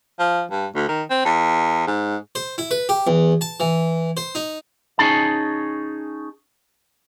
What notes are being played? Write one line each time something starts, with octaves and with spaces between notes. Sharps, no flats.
F3
G2
D2
D#3
C4
E2
G#2
C5
E4
B4
G4
E2
A5
E3
C5
D#4
C#4 D#4 G#4 A5